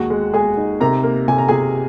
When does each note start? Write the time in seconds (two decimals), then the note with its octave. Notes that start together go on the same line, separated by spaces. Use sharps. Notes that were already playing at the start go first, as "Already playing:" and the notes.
Already playing: D#2 G#3 F#4 F#5
0.10 G#3
0.34 G#3 G#4 G#5
0.57 D#4
0.80 C3 A#4 A#5
1.03 A#3
1.28 C3 G#5
1.38 A#5
1.48 C3 G#4 G#5